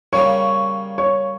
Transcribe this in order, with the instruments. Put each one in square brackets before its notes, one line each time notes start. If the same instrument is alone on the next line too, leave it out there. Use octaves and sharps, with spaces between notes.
[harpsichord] C#3 G3 A#3 [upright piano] C#5 C#6
[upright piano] C#5 C#6